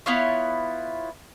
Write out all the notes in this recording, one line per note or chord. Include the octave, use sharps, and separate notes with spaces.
B3 E4 F4 C#5